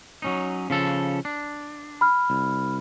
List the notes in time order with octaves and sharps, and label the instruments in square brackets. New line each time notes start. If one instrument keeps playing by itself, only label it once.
[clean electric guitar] F#3 C#4 D#4
C#3 F3 A4
D4
[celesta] B5 F6
[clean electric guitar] C2